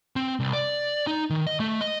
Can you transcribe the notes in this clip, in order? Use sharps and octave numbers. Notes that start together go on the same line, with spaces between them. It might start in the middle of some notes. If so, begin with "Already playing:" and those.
C4
C2
D5
D#4
D#3
D#5
A3
D#5